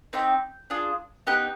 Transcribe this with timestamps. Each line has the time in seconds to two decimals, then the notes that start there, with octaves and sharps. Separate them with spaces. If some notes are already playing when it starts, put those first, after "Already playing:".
0.13 C4 D#4 G4 G6
0.70 D4 F4 G#4
1.27 B3 D#4 G4 F#6